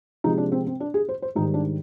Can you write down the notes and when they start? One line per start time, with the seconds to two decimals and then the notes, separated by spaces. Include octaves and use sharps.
0.24 C3 F3 G#3 D#4
0.38 D4
0.52 C4
0.67 C4
0.80 D4
0.94 G#4
1.09 C5
1.22 C5
1.35 G#2 D#3 G3 D#4
1.54 D4